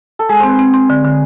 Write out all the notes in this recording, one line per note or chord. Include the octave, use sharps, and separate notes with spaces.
A4
G#3 G#4
C4 C5
B4
C4
C4
D3
D3